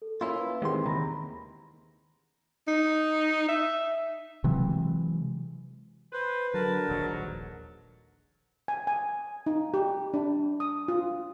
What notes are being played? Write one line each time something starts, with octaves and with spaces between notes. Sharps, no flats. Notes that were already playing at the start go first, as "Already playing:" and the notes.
A4
A#3 C#4 E4 F4 B5 C6
B4
D#3 E3 G#3 C4 G4 G#4 F#5 C6
D#2 C#3 A#5 B5 A#6
D#4
E5
C3 E3 F#3 G#3
B4 C5
D3 F#3 A#4 A5
D#1 A#1 G#2 F#3
G#5
G#5
D#4
G4
D4
D#6
F4